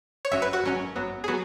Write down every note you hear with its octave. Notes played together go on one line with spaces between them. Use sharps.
C#5
G#1 F#2 F#3 C#4 E5
B4
F#4
G#1 F#2 F#3 C#4
G#1 F#2 F#3 B3
G#4
F#3 B3 F#4